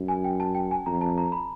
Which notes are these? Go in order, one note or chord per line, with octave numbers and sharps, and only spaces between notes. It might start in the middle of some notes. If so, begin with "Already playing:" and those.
Already playing: F#2
G#5
G5
A5
G5
G#5
F2 A#5
A5
A#5
B5